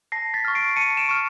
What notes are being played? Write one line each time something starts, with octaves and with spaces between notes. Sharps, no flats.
A5 A#6 C7
A6 B6
C#6 F6
C7 D7
A5 C#7 D#7
D7 E7
C#6 F6